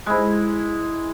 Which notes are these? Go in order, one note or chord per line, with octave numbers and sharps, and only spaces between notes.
G#3 E4